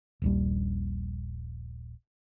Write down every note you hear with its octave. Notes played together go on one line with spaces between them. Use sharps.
D#1 A#1 G3